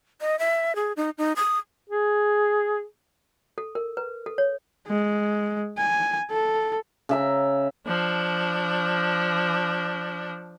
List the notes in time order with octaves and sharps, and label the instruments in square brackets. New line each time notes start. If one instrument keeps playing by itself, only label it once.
[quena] D#5
E5
G#4
D#4
D#4
D#6
[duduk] G#4
[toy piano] A4
A#4
B4
A4
C#5
[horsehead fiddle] G#3
G#5
A4
[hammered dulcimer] C#3 E5 A#5
[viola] F3 D4